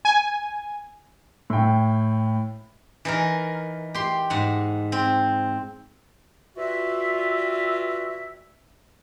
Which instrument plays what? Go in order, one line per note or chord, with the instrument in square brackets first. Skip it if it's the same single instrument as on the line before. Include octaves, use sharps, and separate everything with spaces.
[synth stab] G#5
[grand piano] A2 G5
[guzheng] E3 D#4 A#4
G4 C6
G#2 F#5
C4
[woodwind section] G3 F4 F#4 B4 E5